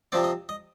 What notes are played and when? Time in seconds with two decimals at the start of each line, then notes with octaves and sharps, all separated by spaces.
0.12 C3 F3 C4 D5
0.24 D#5
0.49 D#5